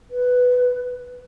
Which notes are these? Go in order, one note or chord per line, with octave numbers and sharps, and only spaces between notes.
B4